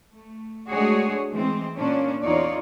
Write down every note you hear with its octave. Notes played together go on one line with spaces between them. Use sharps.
A3
G#3 A3 D4 F#4 G#4 C#5
E3 G#3 C4
A#2 A#3 C#4 D4
E2 D#4 F4 C#5 D5